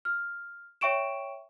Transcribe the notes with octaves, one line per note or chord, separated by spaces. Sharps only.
F6
C#5 E5 G5 C#6 D7 E7